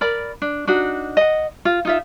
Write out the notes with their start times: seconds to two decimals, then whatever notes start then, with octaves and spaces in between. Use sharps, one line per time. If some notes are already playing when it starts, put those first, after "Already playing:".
0.01 A#4 D5 B5
0.42 D4
0.67 D4 D#4 F#4
1.17 D#5 F#5
1.65 F4
1.85 D#4 F4 E5